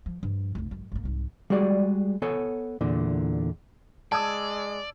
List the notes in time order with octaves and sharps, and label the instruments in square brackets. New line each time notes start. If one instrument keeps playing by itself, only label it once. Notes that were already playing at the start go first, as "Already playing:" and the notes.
[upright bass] F3
G2 F3
F1 B1
G#1 F#2
G#1 A#3
C2 G#2
[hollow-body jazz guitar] G3 G#3 F#4 G#4 D5
B3 A4 C#5 G#5
E2 A#2 D3
[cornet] G#3 [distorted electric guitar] D5 [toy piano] A5 [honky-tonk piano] D#6 E6 G#6